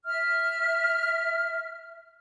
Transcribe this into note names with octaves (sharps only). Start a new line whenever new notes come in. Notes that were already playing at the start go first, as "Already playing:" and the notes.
E5 F6